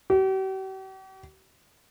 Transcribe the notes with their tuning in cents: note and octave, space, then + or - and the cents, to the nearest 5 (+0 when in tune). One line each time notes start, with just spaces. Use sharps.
G4 -45